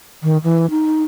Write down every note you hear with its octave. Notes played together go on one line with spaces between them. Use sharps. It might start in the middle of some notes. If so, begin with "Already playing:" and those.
D#3
E3
D#4